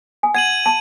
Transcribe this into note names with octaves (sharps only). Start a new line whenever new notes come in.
G#5
F#5 G#6 D#7 F#7
A5